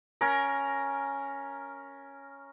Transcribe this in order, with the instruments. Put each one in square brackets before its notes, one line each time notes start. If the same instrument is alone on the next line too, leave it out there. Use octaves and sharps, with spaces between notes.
[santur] C#4 A#4